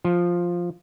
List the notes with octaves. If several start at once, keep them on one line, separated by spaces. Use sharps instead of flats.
F3